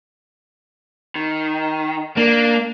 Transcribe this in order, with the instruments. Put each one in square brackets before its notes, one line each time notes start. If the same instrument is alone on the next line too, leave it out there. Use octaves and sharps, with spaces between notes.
[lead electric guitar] D#3
[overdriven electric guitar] A#3 [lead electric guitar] D4